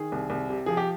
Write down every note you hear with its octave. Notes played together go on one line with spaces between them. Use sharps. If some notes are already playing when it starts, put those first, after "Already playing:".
Already playing: D#3 G#4
C2
C2
C3
F3 G#4
G4